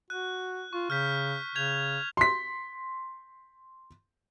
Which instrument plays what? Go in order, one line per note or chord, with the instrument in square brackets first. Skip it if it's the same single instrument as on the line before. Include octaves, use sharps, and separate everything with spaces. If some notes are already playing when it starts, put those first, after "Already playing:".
[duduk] F#4 [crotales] F#6
[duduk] F4 [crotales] C#6
[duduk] C#3 [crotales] F6 G6 B6
[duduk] C#3 [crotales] G6 G#6 F7
[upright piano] C6 B6